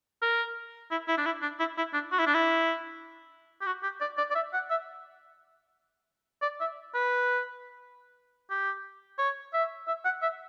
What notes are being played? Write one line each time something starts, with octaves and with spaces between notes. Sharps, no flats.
A#4
E4
E4
D4
E4
D4
E4
E4
D4
F#4
E4
D4
E4
G4
F#4
G4
D5
D5
D5
E5
F#5
E5
D5
E5
B4
G4
C#5
E5
E5
F#5
E5